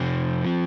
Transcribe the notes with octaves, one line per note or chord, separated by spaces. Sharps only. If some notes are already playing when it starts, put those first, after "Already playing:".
Already playing: F2 C3 F3 C4
F3